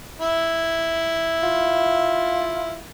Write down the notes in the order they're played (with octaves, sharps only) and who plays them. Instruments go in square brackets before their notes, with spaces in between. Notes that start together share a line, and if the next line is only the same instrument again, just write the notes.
[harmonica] E4
[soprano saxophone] F4